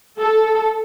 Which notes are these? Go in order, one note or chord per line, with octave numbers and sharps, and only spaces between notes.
A4